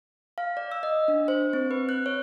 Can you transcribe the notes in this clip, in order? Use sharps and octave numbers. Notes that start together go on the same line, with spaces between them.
F5
D5
E6
D#5
D4
C5
C4
B4
F#6
C#5